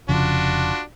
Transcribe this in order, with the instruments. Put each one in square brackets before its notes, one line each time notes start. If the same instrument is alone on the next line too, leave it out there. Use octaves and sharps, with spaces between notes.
[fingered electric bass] F1 C#3 F3 [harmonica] D4 F4 F#4